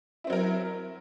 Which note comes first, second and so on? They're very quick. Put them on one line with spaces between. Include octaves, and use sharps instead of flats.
E4 C4 F#3 A#4